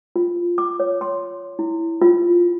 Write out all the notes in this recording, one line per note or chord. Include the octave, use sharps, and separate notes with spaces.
F4
D6
C#5
C6
E4
F4